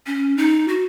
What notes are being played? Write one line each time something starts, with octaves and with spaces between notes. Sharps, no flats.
C#4
D#4
F#4